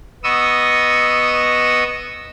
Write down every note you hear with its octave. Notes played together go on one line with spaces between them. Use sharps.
B3 D#5 C#6 D#6 E6